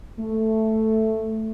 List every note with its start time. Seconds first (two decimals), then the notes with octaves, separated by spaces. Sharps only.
0.20 A3